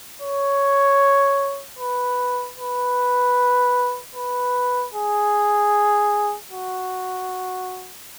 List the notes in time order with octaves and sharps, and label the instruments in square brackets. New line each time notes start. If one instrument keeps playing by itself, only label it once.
[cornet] C#5
B4
B4
B4
G#4
F#4